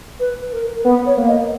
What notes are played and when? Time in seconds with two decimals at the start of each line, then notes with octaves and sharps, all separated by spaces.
0.19 B4
0.52 A#4
0.84 B3 B4
1.06 C#5
1.17 A#3
1.28 D#5